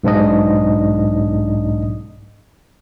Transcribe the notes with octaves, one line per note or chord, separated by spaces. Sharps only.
B1 G#2 D4 D#5